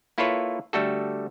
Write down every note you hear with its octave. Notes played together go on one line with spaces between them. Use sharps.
A#3 E4 F4 A4 B4 C#5
D3 G3 A3 F#4 A4